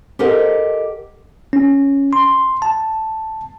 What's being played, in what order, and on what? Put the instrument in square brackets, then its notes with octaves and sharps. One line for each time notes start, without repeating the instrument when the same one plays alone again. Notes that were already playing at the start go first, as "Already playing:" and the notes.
[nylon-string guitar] G4 A4 A#4 C5 D#5 F#5
[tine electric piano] C#4
C6
A5